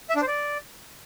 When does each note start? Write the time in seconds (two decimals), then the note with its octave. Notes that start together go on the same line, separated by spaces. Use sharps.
0.10 E5
0.16 D4
0.22 C5
0.27 D5